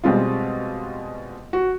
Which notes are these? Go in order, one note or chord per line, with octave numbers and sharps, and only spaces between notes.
B2 G3 G#3 C4 F4
F#4